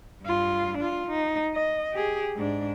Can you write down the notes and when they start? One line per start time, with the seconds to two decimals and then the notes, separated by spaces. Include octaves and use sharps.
0.23 G2 F4
0.78 D4 F4
1.07 D#4
1.55 D#5
1.93 G4 G#4
2.36 G#2 D4